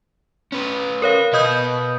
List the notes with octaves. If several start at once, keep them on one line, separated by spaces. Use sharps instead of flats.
C#4 B4
A#4 C#5 F5
B2 B4 D#5 D#6 G6